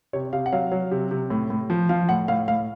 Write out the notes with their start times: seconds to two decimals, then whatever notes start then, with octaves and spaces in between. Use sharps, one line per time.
0.13 C3 C#5
0.33 C3 F5
0.46 F#5
0.52 F#3 F5
0.71 F#3
0.91 C3
1.11 C3
1.30 A2
1.50 A2
1.70 F3
1.89 F3 F5
2.09 A2 F#5
2.28 A2 F5
2.48 A2 F5